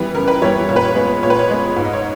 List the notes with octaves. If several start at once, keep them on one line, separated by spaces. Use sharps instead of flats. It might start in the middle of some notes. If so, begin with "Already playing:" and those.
Already playing: E3 G3 B3 B4
C#3 A#4
B4
E3 G3 B3 C#5
A#2 C#5
B4
C#5
G#3 B3
A#2 C#5
B4
C#5
G#3 B3
G#2
D#5
C#5